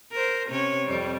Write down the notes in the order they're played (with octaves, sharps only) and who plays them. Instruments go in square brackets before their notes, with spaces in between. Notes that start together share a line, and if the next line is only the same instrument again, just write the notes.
[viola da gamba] A#4 C5
C3 C#4 C#5
F2 G3